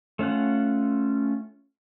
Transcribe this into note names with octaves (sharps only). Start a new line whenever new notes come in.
A3 C#4 F4 F#5